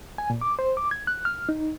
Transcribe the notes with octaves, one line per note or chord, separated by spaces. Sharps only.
G#5
A#2
D6
C5
D6
G#6
F#6
F6
D#4